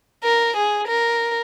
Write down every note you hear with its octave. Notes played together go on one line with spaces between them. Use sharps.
A#4
G#4
A#4